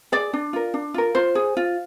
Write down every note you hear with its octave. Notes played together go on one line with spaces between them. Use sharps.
G#4 D5
D4
F4 A#4
D4
F4 A#4
F4 C5
G#4
F4